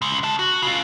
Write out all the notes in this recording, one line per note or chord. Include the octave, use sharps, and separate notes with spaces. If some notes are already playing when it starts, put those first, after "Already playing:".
C#3 G#3
F#4 A5
F#4
C#3 F4